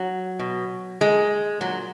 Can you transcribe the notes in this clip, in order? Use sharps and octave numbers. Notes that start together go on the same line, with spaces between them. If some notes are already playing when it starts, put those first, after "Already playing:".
Already playing: F#3
B2
A#2 G#3
A#2 F#3